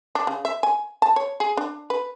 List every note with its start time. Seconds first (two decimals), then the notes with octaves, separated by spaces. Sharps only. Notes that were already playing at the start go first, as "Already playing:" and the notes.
0.15 D4
0.27 C#3
0.45 E5
0.63 G#5
1.02 A5
1.16 C#5
1.40 G#4
1.57 D4
1.90 B4